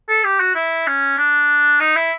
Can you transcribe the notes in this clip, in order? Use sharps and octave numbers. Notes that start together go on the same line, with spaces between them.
A4
G4
F#4
E4
C#4
D4
D#4
E4